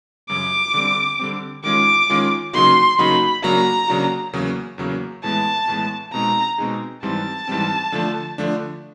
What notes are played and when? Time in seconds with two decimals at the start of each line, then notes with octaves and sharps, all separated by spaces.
0.29 F#2 C#3 F#3 D6
0.74 D3 G3 C4
1.19 D3 G3 C4
1.64 D#3 G#3 C#4 F4 G#4 D6
2.10 D#3 G#3 C#4 F4 G#4
2.53 C#3 F#3 A#3 D#4 F#4 C6
2.98 C#3 F#3 A#3 D#4 F#4 B5
3.43 C#3 F#3 A#3 D4 F#4 A#5
3.88 C#3 F#3 A#3 D4 F#4
4.33 E2 C#3 F#3 A#3
4.78 E2 C#3 F#3 A#3
5.24 A2 E3 G#3 B3 A5
5.68 A2 E3 G#3 B3
6.13 B2 G#3 C4 D#4 G#4 A#5
6.58 B2 G#3 C4 D#4 G#4
7.03 G#2 E3 G3 C4 A5
7.48 G#2 E3 G3 C4
7.92 D3 F3 A3 D4
8.38 D3 F3 A3 D4